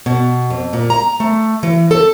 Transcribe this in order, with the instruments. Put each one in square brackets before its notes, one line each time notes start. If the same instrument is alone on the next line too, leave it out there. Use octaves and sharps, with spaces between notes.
[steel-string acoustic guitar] B2
F2
A#2
A#5
A3
E3
A4